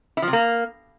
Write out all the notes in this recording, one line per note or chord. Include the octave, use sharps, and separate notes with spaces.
E4
F3
C3
A#3